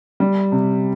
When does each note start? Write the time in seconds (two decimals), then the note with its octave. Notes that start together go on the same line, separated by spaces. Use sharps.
0.20 G3
0.52 C3